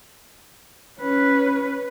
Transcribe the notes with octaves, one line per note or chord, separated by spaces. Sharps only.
C#4 B4